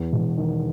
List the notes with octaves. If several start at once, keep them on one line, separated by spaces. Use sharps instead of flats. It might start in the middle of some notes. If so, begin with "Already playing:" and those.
Already playing: E2
E1
D#3